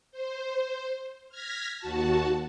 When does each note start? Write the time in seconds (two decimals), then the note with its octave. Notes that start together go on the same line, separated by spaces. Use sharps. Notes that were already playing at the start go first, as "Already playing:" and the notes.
0.12 C5
1.29 F6 G#6 A#6 B6
1.79 D#2 F#4 A5